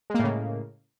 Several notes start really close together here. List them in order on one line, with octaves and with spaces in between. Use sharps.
G#3 A#3 A2 C#3